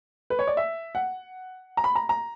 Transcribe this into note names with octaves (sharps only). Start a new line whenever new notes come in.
B4
C#5
D5
E5
F#5
A#5
B5
A#5
A#5